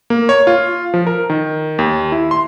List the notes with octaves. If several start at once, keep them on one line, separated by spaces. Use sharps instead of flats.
A#3
C#5
F4
F3
A#4
D#3
D#2
E4
C6